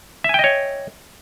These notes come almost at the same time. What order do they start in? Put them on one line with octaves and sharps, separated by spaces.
E5 G#5 G5 D#5 C#5